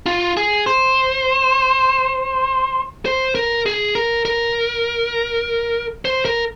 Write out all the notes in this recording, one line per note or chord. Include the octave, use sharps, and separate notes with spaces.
F4
G#4
C5
C5
A#4
G#4
A#4
A#4
C5
A#4